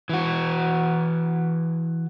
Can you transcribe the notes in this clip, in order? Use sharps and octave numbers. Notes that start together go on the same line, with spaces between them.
E3 F#4